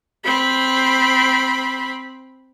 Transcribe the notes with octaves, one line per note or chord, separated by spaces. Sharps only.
C4 B5